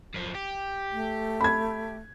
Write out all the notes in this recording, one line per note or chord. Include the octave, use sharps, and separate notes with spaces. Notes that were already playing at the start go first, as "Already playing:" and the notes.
F#2 F3
G4
A3
B5 G#6